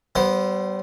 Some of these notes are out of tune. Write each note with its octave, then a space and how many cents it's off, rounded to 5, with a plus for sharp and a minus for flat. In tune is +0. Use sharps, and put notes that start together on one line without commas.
G3 -35 B3 +0 C5 +0